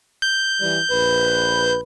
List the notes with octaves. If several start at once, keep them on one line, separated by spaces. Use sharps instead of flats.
G6
E3 G3
A#1 B4